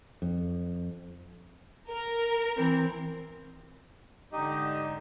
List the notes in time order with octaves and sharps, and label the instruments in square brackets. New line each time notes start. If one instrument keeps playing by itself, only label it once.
[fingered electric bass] F2
[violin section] A#4
[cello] E3 C4
[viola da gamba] G#2 D3 [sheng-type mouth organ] D#4 G4 D#5